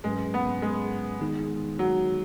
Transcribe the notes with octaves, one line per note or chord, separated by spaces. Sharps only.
G#2 F#3 G#3 C#4 B4
B3
G#3
D#3 G#3 B3 D#4 G#4
F#3